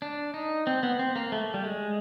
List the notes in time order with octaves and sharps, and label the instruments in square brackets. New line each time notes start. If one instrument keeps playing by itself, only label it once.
[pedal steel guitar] D4
D#4
C4
B3
C4
A#3
A3
G3
G#3